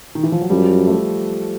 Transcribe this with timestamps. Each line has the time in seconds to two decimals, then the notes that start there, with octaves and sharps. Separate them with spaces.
0.15 D#3
0.23 E3
0.32 F3
0.41 F#3
0.50 F#2 F3 G3
0.87 A3